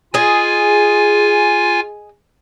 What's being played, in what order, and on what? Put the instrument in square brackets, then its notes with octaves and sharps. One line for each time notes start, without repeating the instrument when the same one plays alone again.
[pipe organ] F4 G#5 [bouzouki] G#4 D#5